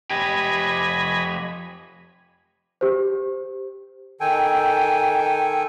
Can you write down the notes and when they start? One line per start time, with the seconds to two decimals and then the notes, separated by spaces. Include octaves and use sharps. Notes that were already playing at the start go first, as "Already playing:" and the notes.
0.11 F2 G4 D#5 G#5 B5
2.81 G4 C5
4.21 D#3 A4 G5 G#5